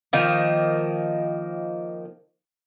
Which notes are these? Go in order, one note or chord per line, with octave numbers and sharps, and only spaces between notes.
D#3 F3 A#3